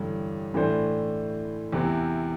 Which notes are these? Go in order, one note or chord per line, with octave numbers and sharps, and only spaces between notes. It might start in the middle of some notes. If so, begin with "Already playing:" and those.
Already playing: A1 G2 D3
A2 E3 A3 D4 C5
E2 C3 E3